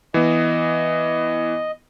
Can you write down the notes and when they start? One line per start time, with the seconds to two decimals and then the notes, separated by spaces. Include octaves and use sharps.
0.14 E3 B3 D#5